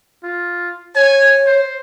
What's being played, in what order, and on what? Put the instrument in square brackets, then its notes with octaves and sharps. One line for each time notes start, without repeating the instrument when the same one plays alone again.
[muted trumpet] F4
[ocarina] C#5 [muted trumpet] G#5
[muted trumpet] C5